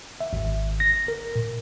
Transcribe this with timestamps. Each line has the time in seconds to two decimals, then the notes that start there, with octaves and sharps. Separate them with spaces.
0.21 E5
0.33 G#1
0.80 A#6
1.08 A#4
1.35 A#2